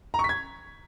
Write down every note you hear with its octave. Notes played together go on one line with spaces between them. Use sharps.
A#5
C#6
B6
G#6